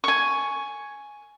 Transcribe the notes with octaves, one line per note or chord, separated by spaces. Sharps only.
G#5 C#6